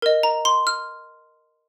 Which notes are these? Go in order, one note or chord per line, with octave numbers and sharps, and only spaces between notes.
A#4 D#5
A#5
C6
F6